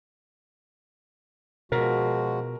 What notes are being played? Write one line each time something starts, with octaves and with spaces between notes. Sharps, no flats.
B2 F3 G#3 F#4 A#4